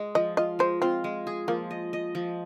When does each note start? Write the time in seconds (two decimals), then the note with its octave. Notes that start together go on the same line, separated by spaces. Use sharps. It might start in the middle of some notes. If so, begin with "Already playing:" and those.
Already playing: G#3
0.15 F3 D#5
0.37 F4 D#5
0.59 G#3 C5
0.82 C4 F4
1.04 G#3
1.27 G#4
1.48 F3 A#3
1.71 D#5
1.93 D#5
2.15 F3